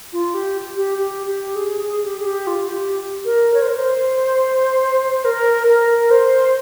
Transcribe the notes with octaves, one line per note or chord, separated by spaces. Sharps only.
F4
G4
G4
G4
G4
G#4
G#4
G4
G#4
G4
F4
G4
A#4
C#5
C5
A#4
C5
A#4
A#4
C5